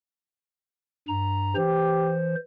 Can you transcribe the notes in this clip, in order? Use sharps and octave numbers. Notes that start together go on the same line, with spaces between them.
G2 A#5
E3 G4 C5